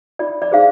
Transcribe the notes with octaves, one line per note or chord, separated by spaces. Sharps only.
F4 D5
D5
G#4 C5 F5